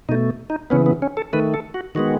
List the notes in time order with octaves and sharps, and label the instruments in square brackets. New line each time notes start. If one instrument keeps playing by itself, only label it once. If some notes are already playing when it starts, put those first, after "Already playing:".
[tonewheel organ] B2 A3 D#4
D#4
C#3 E3 B3 C#4
B3
C#4
A4
D#3 A3 B4
A4
F#4
D#3 G#3 B3 F#4